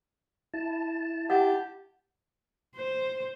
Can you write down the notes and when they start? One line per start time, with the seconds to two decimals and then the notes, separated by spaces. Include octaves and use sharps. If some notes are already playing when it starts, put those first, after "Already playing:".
0.54 E4 A5
1.30 G4 F#5
2.76 C5